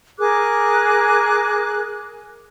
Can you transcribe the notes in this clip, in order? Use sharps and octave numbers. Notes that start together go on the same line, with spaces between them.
G#4 A#4 D6 F#6